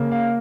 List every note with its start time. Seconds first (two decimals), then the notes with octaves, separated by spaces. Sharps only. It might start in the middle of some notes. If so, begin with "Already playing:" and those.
Already playing: C#3 A#3
0.12 F5